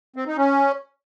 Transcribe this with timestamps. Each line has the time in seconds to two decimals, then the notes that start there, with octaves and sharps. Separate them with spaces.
0.16 C4
0.27 D#4
0.37 C#4